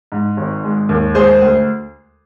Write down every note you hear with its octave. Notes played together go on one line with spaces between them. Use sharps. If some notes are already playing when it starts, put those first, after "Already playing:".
G#2
G#1
G#3
D#2
G#3 G#4 C5
D2